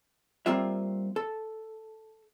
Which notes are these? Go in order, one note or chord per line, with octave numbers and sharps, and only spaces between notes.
G3 A#3 C4 F4 E5
A4